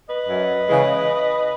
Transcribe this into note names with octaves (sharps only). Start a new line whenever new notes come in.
B4 D#5
F#2
C#3 E3 G#3